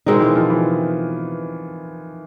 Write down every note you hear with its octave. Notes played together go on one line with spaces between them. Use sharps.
B2 D#3 G#3 C4 D#4
E3
F3
E3